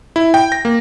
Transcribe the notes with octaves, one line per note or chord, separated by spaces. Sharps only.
E4
G5
A#6
A#3